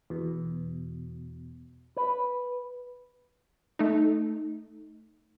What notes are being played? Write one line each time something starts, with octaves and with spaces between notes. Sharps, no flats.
E2 B2
B4
A3 D#4